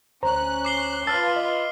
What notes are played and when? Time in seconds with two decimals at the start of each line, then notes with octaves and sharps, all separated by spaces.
0.23 D2 C#4 C5 A#5 F#6
0.65 D6 C7 G7
1.07 F4 B4 A5 E6 F6 A6
1.36 D#5